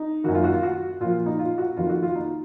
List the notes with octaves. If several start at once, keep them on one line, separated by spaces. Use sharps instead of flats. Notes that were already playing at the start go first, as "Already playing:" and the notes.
Already playing: D#4
F#2 D#3 F#4
F4
F#4
F4
F#4
A#2 F3 F4
D#4
F4
F#4
F2 D#3 F4
F#4
F4
D#4